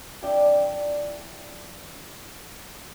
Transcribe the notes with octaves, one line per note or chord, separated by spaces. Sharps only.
F2 D4 E4 D5 G5